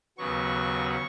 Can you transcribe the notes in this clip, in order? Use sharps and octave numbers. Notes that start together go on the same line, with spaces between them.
D#2 C#3 F#3 B3 C#6